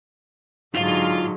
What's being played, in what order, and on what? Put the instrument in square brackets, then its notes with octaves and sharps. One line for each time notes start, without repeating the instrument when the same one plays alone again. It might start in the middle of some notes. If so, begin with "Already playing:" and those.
[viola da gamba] G#2 D3 F#3 [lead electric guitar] F4 F5